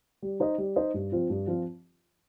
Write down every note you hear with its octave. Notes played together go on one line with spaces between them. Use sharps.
G3
D#4 C5 D#5
G3
D#4 C5 D#5
G2
F3 C4 F4
G2
F3 C4 F4